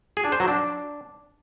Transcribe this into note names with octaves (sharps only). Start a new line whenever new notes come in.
G#4
D4
C5
F#3
D4